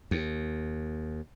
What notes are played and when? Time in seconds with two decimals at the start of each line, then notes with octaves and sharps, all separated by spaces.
0.11 D#2